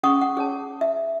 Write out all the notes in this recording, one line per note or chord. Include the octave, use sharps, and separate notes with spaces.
C#4 G#4 F#5 C#6 D#6
F#5
G#4 C#5 A5
E5